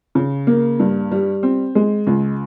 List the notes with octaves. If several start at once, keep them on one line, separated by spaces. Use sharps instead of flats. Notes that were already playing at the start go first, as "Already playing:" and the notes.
C#3
A#3
G2
G3
C4
G#3
C#2